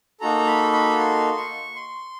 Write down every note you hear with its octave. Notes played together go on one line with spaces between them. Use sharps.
A#3 D#4 F#4 A4 A#5
B5
B5
C6
C#6
C6